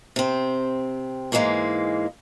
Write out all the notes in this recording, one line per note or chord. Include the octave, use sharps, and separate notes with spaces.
C3 C4
G#2 E3 G3 G#3 A#3